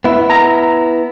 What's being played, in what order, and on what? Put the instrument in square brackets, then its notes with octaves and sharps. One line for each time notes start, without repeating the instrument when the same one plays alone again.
[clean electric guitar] B3 E4
[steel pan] A#5